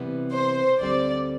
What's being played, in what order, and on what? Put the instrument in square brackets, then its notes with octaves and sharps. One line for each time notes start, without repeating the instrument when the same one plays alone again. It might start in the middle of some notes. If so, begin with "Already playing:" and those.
Already playing: [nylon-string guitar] C3 E3 G3 B3
[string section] C5
[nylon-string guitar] D2 D3 G3 C4 [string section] D5